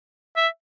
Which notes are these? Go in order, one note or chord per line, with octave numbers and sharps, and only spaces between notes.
E5